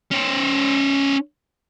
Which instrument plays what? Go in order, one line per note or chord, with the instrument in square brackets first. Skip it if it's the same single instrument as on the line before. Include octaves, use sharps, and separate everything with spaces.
[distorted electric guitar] C#4 C5